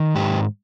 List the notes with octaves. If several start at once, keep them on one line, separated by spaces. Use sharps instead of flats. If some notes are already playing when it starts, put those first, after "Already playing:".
Already playing: D#3
G#2 G4